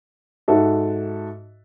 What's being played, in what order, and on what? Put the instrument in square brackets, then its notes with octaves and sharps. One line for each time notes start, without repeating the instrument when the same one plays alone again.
[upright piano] G#2 F#4 A4 E5